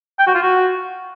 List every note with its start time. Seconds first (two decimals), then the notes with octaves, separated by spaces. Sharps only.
0.19 G5
0.27 F#4
0.34 F4
0.42 F#4